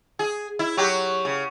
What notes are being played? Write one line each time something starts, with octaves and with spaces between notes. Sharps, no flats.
G#4
E4
F#3 F#4 G4
C#3